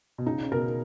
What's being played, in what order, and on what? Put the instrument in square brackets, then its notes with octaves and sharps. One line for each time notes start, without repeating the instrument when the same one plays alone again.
[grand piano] B2
[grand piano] C#3 [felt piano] D#4
[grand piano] C#3
[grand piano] B2 [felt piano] A#4